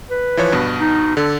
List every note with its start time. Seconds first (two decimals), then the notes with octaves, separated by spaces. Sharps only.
0.11 B4
0.37 E3 F3 C#5
0.52 G2 B2
0.80 D#4
1.17 D3 A4